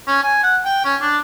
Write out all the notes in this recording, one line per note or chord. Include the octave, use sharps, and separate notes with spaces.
C#4
G#5
F#5
G5
C#4
D4